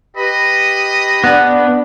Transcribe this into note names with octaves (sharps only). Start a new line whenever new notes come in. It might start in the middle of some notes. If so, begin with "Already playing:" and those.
G4 B4 D#5 B5
B3 D4